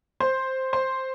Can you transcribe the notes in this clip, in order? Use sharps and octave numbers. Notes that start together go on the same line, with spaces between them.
C5
C5